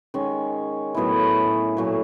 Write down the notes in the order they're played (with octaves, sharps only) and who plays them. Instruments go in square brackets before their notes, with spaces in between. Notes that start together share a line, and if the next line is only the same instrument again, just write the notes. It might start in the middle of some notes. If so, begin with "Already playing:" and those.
[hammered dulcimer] D#3 G#3 C#4
A2 F#3 B3 E4
A#2 F#3 A3